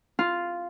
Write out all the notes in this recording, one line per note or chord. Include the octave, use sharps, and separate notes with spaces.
F4